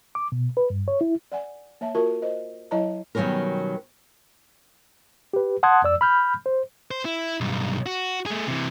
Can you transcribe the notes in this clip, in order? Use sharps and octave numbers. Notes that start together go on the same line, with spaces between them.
D6
B2
B4
G2
C#5
E4
D5 F#5 G#5
A#3 C#5 E5 A5
F4 F#4 A#4 A5 C#6
C5 D#5
F#3 E4 C#5 D#5 A5 A#5
B2 D#3 F#3 G3 C#4 A#4
G4 B4
F#5 A5 C6 D#6 F#6 G#6
F2 D5 E6
B5 F6 G6
C5
C5
E4
B1 G2
F#4
A3 G#4
C3 E3